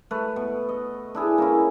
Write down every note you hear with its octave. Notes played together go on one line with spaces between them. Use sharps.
A3 B4
B2
D#5
D4 E4 G#4
A#3 C#4 E4